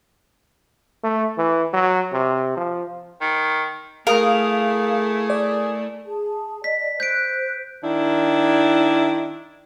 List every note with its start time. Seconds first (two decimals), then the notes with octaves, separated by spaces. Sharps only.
1.04 A3
1.38 E3
1.73 F#3
2.13 C3
2.57 F3
3.22 D#3
4.07 A3 E4 G#4 A#4 F5 D#6
5.30 D5
6.05 G#4 A5
6.64 D5 D#5 B6
7.00 C5 F#6 G6 B6 D7
7.83 D#3 D4 E4